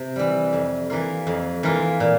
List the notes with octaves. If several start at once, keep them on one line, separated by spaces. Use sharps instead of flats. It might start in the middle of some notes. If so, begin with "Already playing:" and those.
Already playing: C3
E3 G3
F2
E3 A#3 F4
F2
E3 A#3 F4
A#2